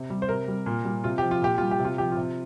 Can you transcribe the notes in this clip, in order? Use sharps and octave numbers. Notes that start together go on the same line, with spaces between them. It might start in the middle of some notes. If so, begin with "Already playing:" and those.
Already playing: C3
G3
C5
C3 A#4
G3
A#2
G3
C3 F4
F3 G4
F4
A#2 G4
G3 F4
G4
C3
F4
F3 G4
C3 F4